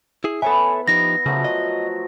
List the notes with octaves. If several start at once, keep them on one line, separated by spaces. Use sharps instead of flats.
E4 G#4
B3 E4 A4 B4 C#5 E5 G#5
F3 D#4 G4 A#6
C#3 F3 F#3 A3
D#5